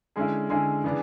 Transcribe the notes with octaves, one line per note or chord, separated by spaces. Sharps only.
D3 G#3 C#4 E4 G#4
D3 G#3 C#4 E4 G#4
C#3 E3 B3 D4